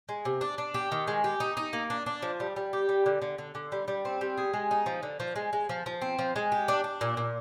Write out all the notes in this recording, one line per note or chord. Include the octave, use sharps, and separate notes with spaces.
G#3
C3
D4
D4
G4
D#3
G#3
G4
D#4
D#4
A#3
D4
D4
F3
G3
G3
G4
G3
D3
D3
D3
D3
G3
G3
C4
G3
G#4
G#3
D#4
F3
D3
F3
G#3
G#3
F3
F3
C4
F3
G#3
G4
D4
D4
A#2
A#2